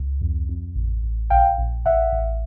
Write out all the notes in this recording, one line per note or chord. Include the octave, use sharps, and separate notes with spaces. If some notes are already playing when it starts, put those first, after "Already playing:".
Already playing: C#2
F2
F2
A1
A1
A#1 F5 G5
A#1
A1 E5 F#5
A1